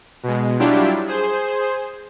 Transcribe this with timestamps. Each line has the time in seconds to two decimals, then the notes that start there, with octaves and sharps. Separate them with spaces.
0.23 B2 G#3
0.59 F#3 G3 D4 E4 F4 G4
1.07 G#4 C5